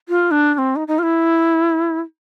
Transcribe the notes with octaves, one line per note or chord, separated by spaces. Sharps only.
F4
D4
D4
C4
D#4
D#4
F4
E4